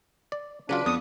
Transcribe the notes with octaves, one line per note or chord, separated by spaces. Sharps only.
D5
C#3 F#3 D4 F4 B4
F2 B3 D#6